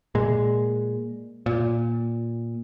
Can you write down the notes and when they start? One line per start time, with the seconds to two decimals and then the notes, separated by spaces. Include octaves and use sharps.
0.15 A#2 G#3
1.46 A#2